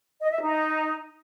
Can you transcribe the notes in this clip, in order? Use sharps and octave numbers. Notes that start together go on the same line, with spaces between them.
D#5
E5
D#4